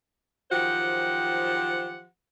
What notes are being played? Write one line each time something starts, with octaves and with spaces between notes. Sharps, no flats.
D#3 F3 F#3 G4 C5 F#5